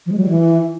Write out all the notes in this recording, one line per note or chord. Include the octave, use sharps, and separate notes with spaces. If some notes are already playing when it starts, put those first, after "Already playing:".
F3
G#3
F#3
G3
E3